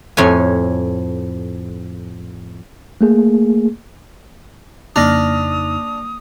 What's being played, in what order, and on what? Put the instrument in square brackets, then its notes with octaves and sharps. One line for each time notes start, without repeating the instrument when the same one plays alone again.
[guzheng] F2 A2 C#5 G#5
[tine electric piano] A3 A#3 G#4
[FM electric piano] F2 C#3 D#4 [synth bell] A#3 F7 [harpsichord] D4 [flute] D#6